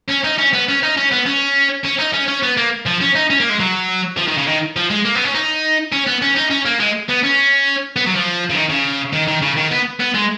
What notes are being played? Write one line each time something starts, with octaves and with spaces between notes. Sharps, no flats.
C#4
D#4
C#4
B3
C#4
D#4
C#4
B3
C#4
C#4
D#4
C#4
C#4
B3
A#3
F3
C#4
D#4
C#4
A#3
G#3
F#3
F3
D#3
C#3
D#3
F3
G#3
A#3
B3
C#4
D#4
C#4
B3
C#4
D#4
C#4
A#3
G#3
B3
C#4
B3
F#3
F3
C#3
D#3
C#3
D#3
D#3
C#3
D#3
B3
B3
G#3